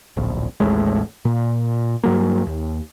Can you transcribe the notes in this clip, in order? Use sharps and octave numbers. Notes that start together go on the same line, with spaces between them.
D1 A#1
A1 D#2 A2 G#3
A#2
G2 F#3 A#3
D#2